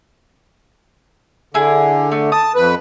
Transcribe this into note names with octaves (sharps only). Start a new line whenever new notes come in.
D3 E4 G#4
A3
A5 D#6
F2 B4